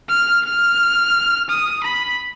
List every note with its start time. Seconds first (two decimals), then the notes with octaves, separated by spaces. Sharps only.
0.09 F6
0.45 F6
1.49 D#6
1.84 B5